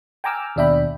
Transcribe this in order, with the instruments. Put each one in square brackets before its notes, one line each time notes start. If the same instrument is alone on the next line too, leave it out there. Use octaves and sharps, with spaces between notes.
[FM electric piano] G5 G#5 A#5 D6 E6 F6
D#2 B2 D4 E5 G5 B5